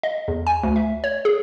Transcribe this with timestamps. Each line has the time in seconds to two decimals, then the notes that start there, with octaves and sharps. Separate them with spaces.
0.03 D#5
0.28 E2
0.47 G#5
0.64 D2
0.76 E5
1.04 C#5
1.25 G#4